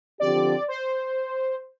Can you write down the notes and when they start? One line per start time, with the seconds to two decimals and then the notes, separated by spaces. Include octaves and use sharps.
0.20 D3 F3 C4 G4 D5
0.68 C5